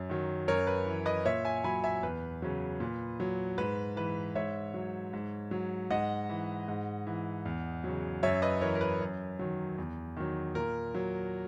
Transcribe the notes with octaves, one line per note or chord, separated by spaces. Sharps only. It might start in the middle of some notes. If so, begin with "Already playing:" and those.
Already playing: F#2
D#3 F#3
F#2 A#4 C#5
B4
E3
B4 D#5
A#2 C#5 E5
E5 G#5
F#3 G#5 B5
E5 G#5
E2 B4
C#3 F#3
A#2
F#3
G#2 B4
E3 B4
G#2 C#5 E5
F#3
G#2
F#3
G#2 D#5 F#5
E3
G#2
E3
E2
C#3 F#3
F#2 C#5 E5
B4 D#5
E3 A#4 C#5
A#4
B4
F#2
D#3 F#3
E2
D#3 F#3
A#2 A#4
F#3